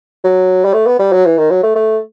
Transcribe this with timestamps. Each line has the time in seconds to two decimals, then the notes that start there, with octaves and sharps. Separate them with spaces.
0.24 F#3
0.65 G3
0.74 A3
0.87 B3
0.99 G3
1.12 F#3
1.26 E3
1.38 D#3
1.51 F#3
1.63 A3
1.75 A3